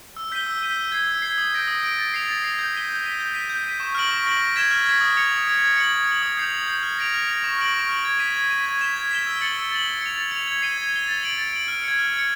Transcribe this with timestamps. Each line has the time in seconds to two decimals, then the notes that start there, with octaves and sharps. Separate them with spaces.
0.17 E6
0.32 G6 B6 D#7 G7
0.47 E6
0.62 G6 B6 D#7 G7
0.77 E6
0.92 G#6 C7
1.07 E6
1.22 G#6 C7
1.38 D#6
1.53 G6 A#6 D7
1.68 D#6
1.82 G6 A#6 D7
1.98 A6
2.14 C7 F7
2.28 A6
2.44 C7 F7
2.59 G6
2.75 B6 D#7 G7
2.89 G6
3.04 B6 D#7 G7
3.20 G6
3.34 B6 D#7
3.50 G6
3.64 B6 D#7
3.80 C#6
3.95 F6 A#6 D7 F#7
4.11 C#6
4.26 F6 A#6 D7 F#7
4.41 F6
4.56 G#6 B6 E7 G7
4.71 F6
4.86 G#6 B6 E7 G7
5.01 D#6
5.17 G#6 C#7 F7
5.32 D#6
5.47 G#6 C#7 F7
5.62 G#6
5.77 C#7 F#7
5.93 G#6
6.07 C#7 F#7
6.22 D#6
6.37 G6 C7 F7
6.54 D#6
6.68 G6 C7 F7
6.83 F6
6.98 A#6 D7 F7
7.14 F6
7.28 A#6 D7 F7
7.44 C#6
7.58 F6 A#6 D7 F#7
7.74 C#6
7.89 F6 A#6 D7 F#7
8.05 G#6
8.19 B6 D#7
8.35 G#6
8.50 B6 D#7
8.66 G#6
8.81 B6 E7 G7
8.96 G#6
9.11 B6 E7 G7
9.26 E6
9.41 A6 C#7 F#7
9.56 E6
9.72 A6 C#7 F#7
9.86 A6
10.01 C#7 F7
10.17 A6
10.31 C#7 F7
10.48 G#6
10.62 C7 D#7 G7
10.78 G#6
10.93 C7 D#7 G7
11.08 A6
11.23 D7 F#7
11.38 A6
11.53 D7 F#7
11.68 F6
11.83 G#6 C#7
11.99 F6
12.14 G#6 C#7